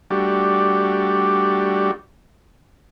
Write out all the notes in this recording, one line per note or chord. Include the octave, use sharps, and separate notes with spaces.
G3 A3 D4 F#4 G4